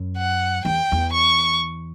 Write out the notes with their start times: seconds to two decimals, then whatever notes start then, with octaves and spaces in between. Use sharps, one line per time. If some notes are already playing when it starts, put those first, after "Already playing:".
Already playing: F#2
0.18 F#5
0.65 E2 G5
0.92 E2
1.13 C#6